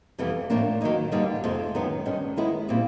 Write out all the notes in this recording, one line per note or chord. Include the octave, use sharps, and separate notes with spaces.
F2 C3 E3 G3 B3
A2 F3 A#3 D4
D#3 F#3 A#3 D#4
G2 D3 G3 A#3 D#4
F2 C3 F3 G#3
F#2 D#3 G#3 B3
G2 D#3 G#3 C#4
D#3 G#3 B3 E4
A#2 G3 C4